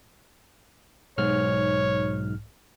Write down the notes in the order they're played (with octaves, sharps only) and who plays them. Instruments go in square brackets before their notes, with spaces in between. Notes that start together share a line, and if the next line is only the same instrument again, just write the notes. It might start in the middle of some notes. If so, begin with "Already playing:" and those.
[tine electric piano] B1 G#2 F6 [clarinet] C#5